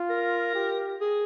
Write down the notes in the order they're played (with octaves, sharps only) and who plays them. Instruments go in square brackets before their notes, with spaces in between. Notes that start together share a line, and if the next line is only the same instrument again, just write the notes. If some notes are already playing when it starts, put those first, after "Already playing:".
Already playing: [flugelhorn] F4
[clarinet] A#4
[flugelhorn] G4
[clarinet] G#4